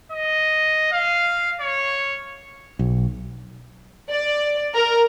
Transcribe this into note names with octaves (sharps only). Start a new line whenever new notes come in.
D#5
F5
C#5
B1
D5
A#4